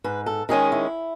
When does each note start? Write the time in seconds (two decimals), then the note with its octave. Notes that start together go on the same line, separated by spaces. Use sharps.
0.04 G#2 B4
0.26 A4
0.49 D#3 G#3 C#4 G#4
0.72 E4